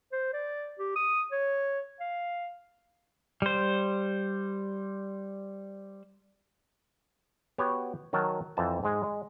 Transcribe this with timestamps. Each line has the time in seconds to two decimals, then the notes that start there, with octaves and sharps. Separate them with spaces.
0.12 C5
0.33 D5
0.79 G4
0.96 D#6
1.32 C#5
2.00 F5
3.42 G3 C5
7.58 B3 F#4 G4 C#5 F#5
8.13 D#3 F#3 F#4 A#4 A5
8.57 F2 E3 C5 A5 A#5
8.83 G#2 G#3
9.03 G#3